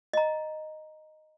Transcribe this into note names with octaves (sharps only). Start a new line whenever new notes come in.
D#5 A#5